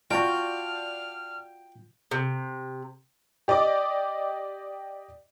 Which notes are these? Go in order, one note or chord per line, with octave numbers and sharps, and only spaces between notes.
F4 F#4 D5 G5 A5 F6 G6
C3
G4 D5 D#5 D6